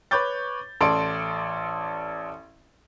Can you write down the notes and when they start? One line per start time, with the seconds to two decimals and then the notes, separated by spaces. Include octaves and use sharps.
0.11 B4 C#5 D6 G6 A6
0.81 A1 A4 D5 C6 D7